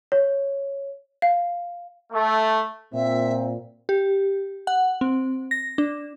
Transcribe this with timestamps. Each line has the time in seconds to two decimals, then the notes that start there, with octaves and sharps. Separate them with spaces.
0.12 C#5
1.22 F5
2.12 A3
2.93 A#2 C4 E5
3.89 G4
4.67 F#5
5.01 C4
5.51 A#6
5.78 D4